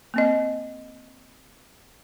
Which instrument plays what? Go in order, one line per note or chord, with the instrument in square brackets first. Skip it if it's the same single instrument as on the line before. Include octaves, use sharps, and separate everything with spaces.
[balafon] A#3 C4 D#5